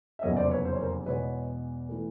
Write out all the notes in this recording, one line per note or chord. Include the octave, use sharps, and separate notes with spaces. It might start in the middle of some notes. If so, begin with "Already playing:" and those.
E5
F1 E2 C#3 F#3 A#3 C#5 D#5
C5 D5
B4 C#5
C5
C#5
A#4 C5
E2 B2 G#3 B3 B4 C#5
E3 A3